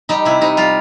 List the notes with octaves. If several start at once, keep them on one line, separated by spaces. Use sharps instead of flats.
G3 D#4
C3 E4
C3 D#4
G3 F4